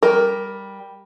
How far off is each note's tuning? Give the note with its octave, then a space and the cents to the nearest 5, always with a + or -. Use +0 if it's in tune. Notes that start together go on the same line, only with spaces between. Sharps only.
G3 +0 A#4 +10